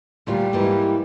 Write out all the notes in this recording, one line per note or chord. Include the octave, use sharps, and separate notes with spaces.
D2 A#2 G3 F4
G#2 E3 A#3